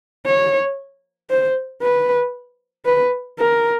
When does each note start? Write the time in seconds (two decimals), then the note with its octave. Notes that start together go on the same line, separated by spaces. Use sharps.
0.26 C#5
1.30 C5
1.82 B4
2.86 B4
3.39 A#4